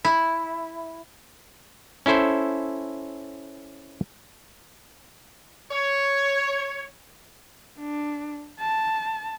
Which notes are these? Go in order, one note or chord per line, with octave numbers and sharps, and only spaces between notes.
E4
C#4 E4 A4 C5
C#5
D4
A5